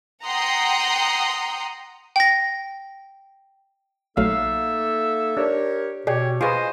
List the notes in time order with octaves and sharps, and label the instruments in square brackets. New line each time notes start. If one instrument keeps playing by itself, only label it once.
[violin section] F#5 G5 A#5 C6 D#6
[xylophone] G5 A#6
[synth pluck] A#1 F#3 A3 [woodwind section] A#3 D#4 A4 [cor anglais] E5 [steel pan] F5
[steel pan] D4 [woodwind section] G4 A#4 C#5
[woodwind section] B2 [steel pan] G4 [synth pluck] G#4 D5 [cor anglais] C#5
[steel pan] F4 G#4 B4 [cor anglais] C5 [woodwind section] D#5 D#6 [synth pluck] G#5 C#6